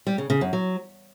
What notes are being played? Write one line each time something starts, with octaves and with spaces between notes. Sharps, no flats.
G3
C#3
C#3
F#2
F#3